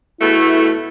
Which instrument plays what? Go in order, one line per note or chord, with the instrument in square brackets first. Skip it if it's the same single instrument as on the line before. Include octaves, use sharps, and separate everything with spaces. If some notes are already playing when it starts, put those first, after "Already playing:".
[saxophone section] E2 B2 A3 [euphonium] E4